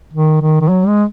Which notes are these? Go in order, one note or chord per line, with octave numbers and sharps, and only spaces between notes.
D#3
D#3
D#3
F#3
G#3